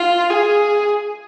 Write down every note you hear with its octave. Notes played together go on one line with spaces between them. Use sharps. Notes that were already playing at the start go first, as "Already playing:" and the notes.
Already playing: F4
G#4